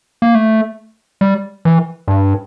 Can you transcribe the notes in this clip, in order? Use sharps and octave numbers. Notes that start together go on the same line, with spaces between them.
A#3
A3
G3
E3
G2